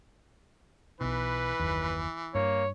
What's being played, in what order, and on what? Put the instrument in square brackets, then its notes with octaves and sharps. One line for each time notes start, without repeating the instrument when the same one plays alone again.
[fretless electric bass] B1 B2 [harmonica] E3 [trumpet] B4
[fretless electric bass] F#1 D#2
[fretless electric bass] G2 [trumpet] A#3 [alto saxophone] C#5